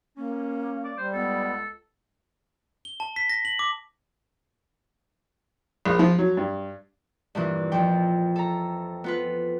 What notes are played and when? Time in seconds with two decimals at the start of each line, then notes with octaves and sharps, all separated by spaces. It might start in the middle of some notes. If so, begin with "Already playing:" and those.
0.17 A#3 C#4
0.84 D5
0.98 G3 C5
1.13 C#2 B3 A4
2.85 G7
3.00 A5
3.16 B6
3.30 A#6
3.45 F#7
3.59 D6
5.86 A#1
5.99 F3
6.18 F#3
6.37 G2
7.35 G2 A#2 E3
7.72 F2 F3 G5
8.36 A4 A#5
9.04 B3 F4 B4